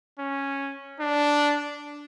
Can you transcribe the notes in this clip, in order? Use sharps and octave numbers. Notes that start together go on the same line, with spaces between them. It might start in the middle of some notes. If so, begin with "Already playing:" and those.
C#4
D4